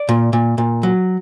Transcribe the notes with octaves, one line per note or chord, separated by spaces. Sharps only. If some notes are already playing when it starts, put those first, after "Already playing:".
Already playing: D5
A#2
A#2
A#2
F#3